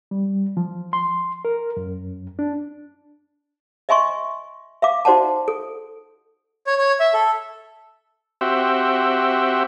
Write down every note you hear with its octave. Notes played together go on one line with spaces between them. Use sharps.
G3
F3
C6
A#4
F#2
D4
D#5 E5 G#5 C6 C#6
E5 F5 D6
D#4 F#4 C5 D5 F#5 A5
A4
C#5
C#5
E5
A4
C4 F#4 G4 E5